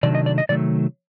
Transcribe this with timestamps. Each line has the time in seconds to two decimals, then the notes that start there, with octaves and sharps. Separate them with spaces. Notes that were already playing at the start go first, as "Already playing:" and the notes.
0.03 C3 D#3 F#3 A3 D4 D5
0.15 D#5
0.26 D5
0.38 D#5
0.49 C3 D#3 F#3 A3 D5